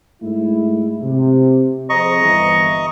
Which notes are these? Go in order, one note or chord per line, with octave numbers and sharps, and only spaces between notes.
G#2 A3 E4
C3
F2 G#4 C5 D#5 A#5 C#6
G1 E3